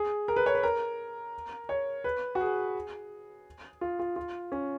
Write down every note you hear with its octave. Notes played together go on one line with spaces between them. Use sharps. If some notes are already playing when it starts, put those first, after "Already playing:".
Already playing: G#4
A#4
B4
C#5
B4
A#4
C#5
B4
F#4
G#4
F4
F4
F4
C#4